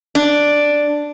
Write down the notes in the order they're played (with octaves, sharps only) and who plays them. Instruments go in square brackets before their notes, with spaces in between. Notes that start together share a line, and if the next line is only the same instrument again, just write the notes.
[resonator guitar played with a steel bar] D4